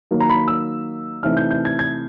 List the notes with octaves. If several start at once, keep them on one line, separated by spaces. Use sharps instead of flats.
D#3 F#3 A#3
A#5
B5
E6
C3 E3 A3 C4 D#4 F6
G6
G6
G#6
G#6